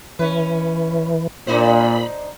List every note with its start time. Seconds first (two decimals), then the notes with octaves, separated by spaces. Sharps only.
0.19 E3 C#4 B4
1.47 A#2 D4 D#4 C5 B5